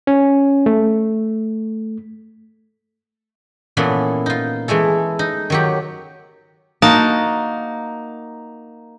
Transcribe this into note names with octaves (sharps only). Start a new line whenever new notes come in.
C#4
A3
A#2 E3 B3 C#4 F4 A4
D#4 F4
E3 G#3 A3 A4
D#4
D#3 F#3 G4
A#3 D#4 F#4 A5